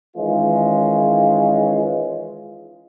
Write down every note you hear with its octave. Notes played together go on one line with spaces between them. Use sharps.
D#3 E3 G#3 C#4 F4